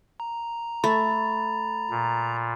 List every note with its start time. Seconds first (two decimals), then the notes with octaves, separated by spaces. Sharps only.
0.20 A#5
0.84 A3 B5 A6
1.90 A#2